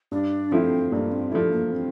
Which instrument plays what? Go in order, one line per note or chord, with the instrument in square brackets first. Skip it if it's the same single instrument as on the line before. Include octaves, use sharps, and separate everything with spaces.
[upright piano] G2 [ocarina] D4
[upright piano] F3 A3 E4 [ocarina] C4
[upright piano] G2 [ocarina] A#3
[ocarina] C4
[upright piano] F3 A3 E4 [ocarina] D4
[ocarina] A#3
C4